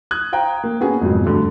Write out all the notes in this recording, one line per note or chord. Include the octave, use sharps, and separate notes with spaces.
D#6 F#6 G#6
C5 F5 G5 A#5
A#3
A#3 B3 C#4 F#4 G#4
F2 G#2 B2 F#3
D2 G2 D3